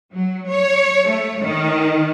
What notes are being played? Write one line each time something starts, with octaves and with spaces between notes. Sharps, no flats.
F#3
C#5
A3
D#3